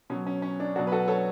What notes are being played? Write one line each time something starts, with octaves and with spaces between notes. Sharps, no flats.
B2 F#3 C#4
C#4
C#4
D4
B2 F#3 D4 F#4
B4
F#4 A4
A4 C#5